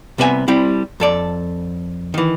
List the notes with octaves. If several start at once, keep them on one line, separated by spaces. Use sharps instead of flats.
C2 C3 B3 F#4 E5 G#5
G3 C4 E4
F2 A4 D5
D#3 E3